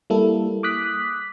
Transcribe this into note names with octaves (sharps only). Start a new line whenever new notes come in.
G3 A#3 E4 A4
D6 D#6 F#6 B6